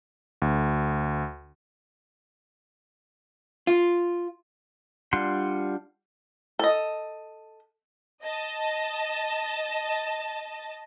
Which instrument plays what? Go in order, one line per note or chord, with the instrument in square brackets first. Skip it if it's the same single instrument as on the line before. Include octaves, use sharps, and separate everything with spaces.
[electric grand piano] D2
[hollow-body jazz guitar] F4
[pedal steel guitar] G3 D4 F4 F#5 C6
[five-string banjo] A4 D#5
[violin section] D#5 A5